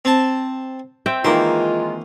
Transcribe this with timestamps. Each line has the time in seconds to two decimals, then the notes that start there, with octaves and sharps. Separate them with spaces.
0.05 C4 A5
1.06 C4 E5 G5
1.24 D#3 E3 G#3 A#3 F4 C6